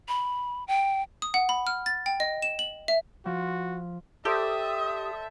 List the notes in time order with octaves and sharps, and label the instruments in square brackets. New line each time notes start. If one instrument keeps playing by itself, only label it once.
[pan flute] B5
G5
[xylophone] D#6
F#5
B5
F6
A6
G5
D#5
E7
F#7
E5
[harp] F3 [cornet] F#4
[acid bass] G4 [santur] A4 C5 D5 [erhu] E5 [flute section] D#6